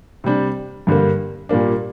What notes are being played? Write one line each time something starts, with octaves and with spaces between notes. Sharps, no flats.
C3 G3 D4
G2 D3 G3 A#3
A#2 G3 A#3 D4